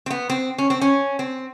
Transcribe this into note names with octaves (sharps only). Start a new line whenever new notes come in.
C4
B3
C4
C#4
C4
C#4
C4